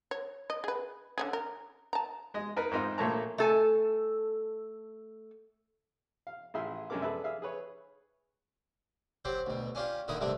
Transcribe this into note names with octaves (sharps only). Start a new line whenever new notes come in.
C#5
D#5
G#4 B4
D3 C#4 G#4
A#4
A5 A#5
G#3 D#5
D#4 A#4 B4
G#2 C4 D#4 F4
A#1 A3 A#3 C#5 A5 A#5
A3 A4 G#5
F5
A1 E4 G#4 E5 F5 C6
F#2 G#3 C#4 D4 A#4 D6
G#4 A4 B4 D5 E5
G#4 E5 F5
G#4 B4 C#5
F#3 C4 G4 C5
D2 B2
C#4 D4 F4 G4
A#2 D3 D#3 E4 D#6
G2 C3 G3 A3 D4